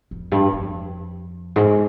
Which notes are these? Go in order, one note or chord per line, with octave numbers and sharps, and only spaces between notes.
F2
G2
F2
G#2